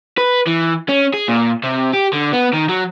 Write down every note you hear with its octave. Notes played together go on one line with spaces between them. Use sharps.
B4
E3
C#4
G#4
A#2
C3
G4
D3
B3
D#3
F#3